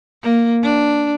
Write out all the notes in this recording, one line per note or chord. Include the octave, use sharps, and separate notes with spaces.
A#3
D4